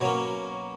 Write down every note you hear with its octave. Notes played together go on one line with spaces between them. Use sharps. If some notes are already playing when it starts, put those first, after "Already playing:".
B2 F#3 A#3 C#4 C#5